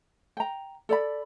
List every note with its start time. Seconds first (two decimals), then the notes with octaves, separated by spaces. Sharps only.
0.37 G5 A#5
0.89 A4 D5 B5